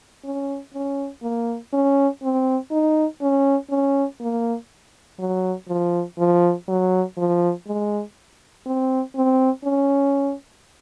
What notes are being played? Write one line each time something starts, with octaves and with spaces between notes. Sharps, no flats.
C#4
C#4
A#3
C#4
C4
D#4
C#4
C#4
A#3
F#3
F3
F3
F#3
F3
G#3
C4
C4
C#4